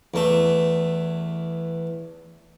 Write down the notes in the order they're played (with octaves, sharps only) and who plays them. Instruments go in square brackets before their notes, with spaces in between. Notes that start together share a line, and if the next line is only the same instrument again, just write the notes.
[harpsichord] E2 A3